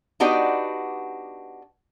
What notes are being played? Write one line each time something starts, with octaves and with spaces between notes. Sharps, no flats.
B3 D4 D#4 F#4 G4 B4